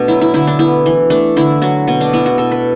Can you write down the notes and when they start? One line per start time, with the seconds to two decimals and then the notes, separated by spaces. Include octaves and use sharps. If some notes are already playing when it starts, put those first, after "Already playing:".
Already playing: B2 A3 D4
0.08 F#3 E4
0.21 E4
0.34 D3 E4
0.47 D4
0.59 B3 E4
0.86 E3
1.10 A3 D4
1.36 D3 E4
1.62 F#3 F#4
1.87 B2 F#4
2.01 D4
2.13 B3 E4
2.26 F#4
2.38 B2 A4
2.52 B4